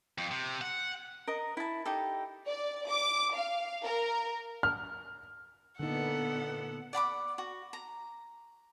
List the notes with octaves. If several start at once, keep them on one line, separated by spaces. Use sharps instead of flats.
F2
C3
F#5
A#4 D#5 A#5
E4 A5
D#4 G4 A4
D5
D6
F5
A#4
F6
A#2 D3 B3 D#4 A4 F#5
D5 F#5 B5 D6
F#4
A#5